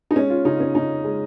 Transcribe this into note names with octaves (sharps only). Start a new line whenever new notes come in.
D#4
G#3 C#4
F4
C#3 D#4
C#4
C#3 D#4
G#3